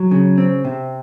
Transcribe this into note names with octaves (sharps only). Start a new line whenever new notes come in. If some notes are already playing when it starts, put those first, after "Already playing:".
Already playing: F#3
C#3
C4
C3